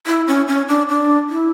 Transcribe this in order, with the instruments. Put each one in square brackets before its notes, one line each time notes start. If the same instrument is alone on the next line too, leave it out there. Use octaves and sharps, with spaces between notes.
[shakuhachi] E4
C#4
C#4
D4
D4
E4